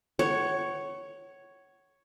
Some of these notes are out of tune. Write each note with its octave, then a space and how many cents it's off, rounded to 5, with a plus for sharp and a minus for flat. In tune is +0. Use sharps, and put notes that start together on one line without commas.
C#5 +0 F#5 +30